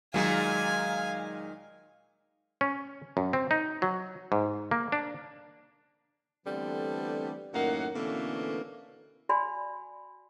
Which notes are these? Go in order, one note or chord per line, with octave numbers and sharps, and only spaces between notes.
A#2 D#3 F#3 G#3 F5 G#5
C#4
F#2
C4
D#4
F#3
G#2
A#3
D4
D3 E3 G3 A3 B3 C4
F#2 A2 D#3 A#3 F#5
B2 D3 E3 A3 A#3 C#4
F#4 D5 G#5 B5 C6